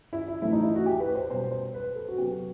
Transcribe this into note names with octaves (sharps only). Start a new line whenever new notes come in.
E4
E4
A2 E3 A3 C4 E4
D#4
E4
F#4
G4
B4
C5
B2 G3 B3 C5
C5
B4
A4
F#4
C3 F#3 B3 G4